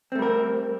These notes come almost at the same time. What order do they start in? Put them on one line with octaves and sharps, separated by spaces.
C4 A3 G3 A#4